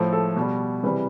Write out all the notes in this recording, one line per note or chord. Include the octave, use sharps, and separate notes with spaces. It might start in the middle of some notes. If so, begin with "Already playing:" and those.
Already playing: A2 F3 A3
A4
B2 G3
C3 E3 G3 B4